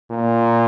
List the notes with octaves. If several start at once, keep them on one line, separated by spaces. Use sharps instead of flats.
A#2